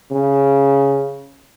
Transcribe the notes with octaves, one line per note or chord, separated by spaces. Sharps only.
C#3